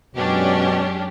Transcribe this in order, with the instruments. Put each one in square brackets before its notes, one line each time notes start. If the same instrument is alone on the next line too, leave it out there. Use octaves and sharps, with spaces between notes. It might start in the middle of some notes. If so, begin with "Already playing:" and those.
[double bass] F#2 G#3 [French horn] B2 [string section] C#4 D4 G4